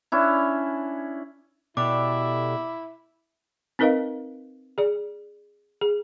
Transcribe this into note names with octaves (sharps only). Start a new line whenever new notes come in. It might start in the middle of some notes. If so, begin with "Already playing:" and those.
C#4 D4 E4
B2 D4 E4 G4 A4 D6
C4 D#4 A#4 B4 D#5 F5
G#4 D5
G#4